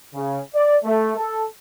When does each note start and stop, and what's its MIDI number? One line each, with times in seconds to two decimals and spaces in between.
0.15 0.39 49
0.55 0.77 74
0.85 1.12 57
1.16 1.46 69